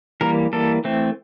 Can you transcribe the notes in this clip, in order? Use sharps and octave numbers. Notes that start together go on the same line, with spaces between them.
E3 G3 A#3 A#4
E3 G3 A#3 A4
E3 A3 C4